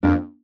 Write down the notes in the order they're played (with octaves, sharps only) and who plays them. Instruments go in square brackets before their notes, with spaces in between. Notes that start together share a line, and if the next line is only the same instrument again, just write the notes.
[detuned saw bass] F2 [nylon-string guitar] A#3 D4